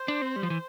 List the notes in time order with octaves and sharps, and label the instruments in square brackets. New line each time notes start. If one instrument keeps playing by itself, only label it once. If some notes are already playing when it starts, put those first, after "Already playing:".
Already playing: [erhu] C5
[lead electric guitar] D4
C4
G3
F3
E3